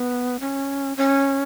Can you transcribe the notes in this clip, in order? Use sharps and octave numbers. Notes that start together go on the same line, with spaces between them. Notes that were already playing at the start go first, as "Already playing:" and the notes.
Already playing: B3
C#4
C#4